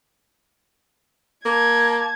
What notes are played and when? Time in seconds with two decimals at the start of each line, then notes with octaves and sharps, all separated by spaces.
1.45 A#3 A5 G#6